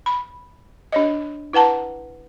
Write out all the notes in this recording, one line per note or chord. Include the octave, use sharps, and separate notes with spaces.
B5
D4 C#5 D#5
E4 B4 F#5 A5 A#5